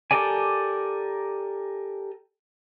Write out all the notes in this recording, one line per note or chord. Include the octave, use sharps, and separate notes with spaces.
G4 A4 A#4 D5 G#5